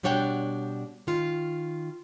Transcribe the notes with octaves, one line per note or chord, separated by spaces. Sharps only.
B2 G3 D4 C#5 F#5 G5
D#3 F4